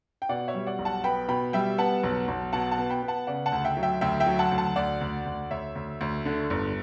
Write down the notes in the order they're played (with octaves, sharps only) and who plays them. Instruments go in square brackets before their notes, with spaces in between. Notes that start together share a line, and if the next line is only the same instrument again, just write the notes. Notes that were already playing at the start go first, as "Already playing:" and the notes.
[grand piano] G5
B2 D5 F#5
C#5 E5
G3
D5 F#5
B1
F#5 A5
B3 G5 B5
B2 G5 B5
G3 E5 G5
B3 F#5 A5
B1
B1
B2 F#5 A5
F#5 A5
B3
G5 B5
B3
F#5 A5
C#3 D5 F#5
F#5 A5
D2
E5 G5
F#3
E5 G5
D2 E5 G5
E5 G5
F#3
F#5 A5
D2
F#5 A5
D2 D5 F#5
D2
D2
D2 C#5 E5
D2
D2
D3
G1